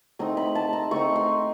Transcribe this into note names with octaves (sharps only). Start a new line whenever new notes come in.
A3 C4 D#4 A#5
B5
A5
A#5
A3 C4 D#4 C#6
C6